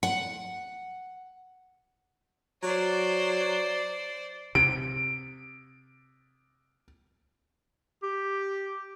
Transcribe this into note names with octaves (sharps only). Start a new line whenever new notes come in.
F#5
F#3 C5 D5
C3 D7
G4